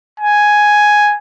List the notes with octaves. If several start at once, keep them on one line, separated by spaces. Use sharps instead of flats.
G#5